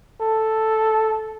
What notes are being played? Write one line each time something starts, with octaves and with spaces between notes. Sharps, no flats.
A4